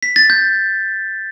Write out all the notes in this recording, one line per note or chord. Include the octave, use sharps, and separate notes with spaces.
B6
A6
G6